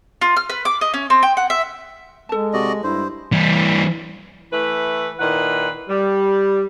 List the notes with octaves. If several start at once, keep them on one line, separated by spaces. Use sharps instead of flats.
F4
F6
B4
D6
D#5
C#4
C4
G5
F#5
E5
G#3 A4 A5
C3 F#4 D5 D#5
G2 E4 C5
E3 G3
E3 A3 E4 B4
A#2 D#3 E4 B4 F#5
G3